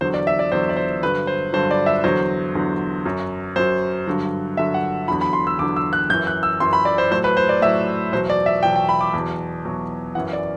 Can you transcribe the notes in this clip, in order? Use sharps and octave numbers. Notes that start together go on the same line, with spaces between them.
E2 D3 F#3 C5
D5
E5
D5
E2 D3 F#3 C5
D5
C5
G2 D3 F#3 B4
C5
G2 D3 F#3 C5
D5
E5
E2 D3 F#3 C5
E2 D3 F#3
F#2 F#3
F#2 F#3 C5
G2 D3 F#3
G2 D3 F#3 E5
F#5
E2 D3 F#3 B5
B5
C6
E6
E2 D3 F#3 D6
E6
F#6
F#2 E3 G6
F#6
E6
F#2 E3 C6
B5
D5
C5
A2 F#3 C5
B4
C5
D5
A2 F#3 E5
E2 B2 F#3 C5
D5
E5
E2 B2 F#3 G5
G5
B5
D6
E2 B2 F#3
E2 B2 F#3
F#2 E3 F#5
D5